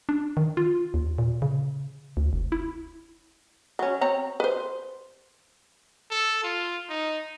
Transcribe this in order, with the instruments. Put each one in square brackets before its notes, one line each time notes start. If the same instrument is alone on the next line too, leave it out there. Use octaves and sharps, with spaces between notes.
[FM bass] D4
D#3
F4
D#2
A#2
C#3
D2
F1
E4
[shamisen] F#3 C#4
C4 C#5 A#5
B4 C5
[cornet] A4
F4
D#4